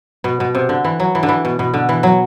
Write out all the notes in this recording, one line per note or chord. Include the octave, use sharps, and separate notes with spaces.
B2
B2
C3
D3
E3
F#3
E3
D3
E3
B2
B2
D3
E3
F#3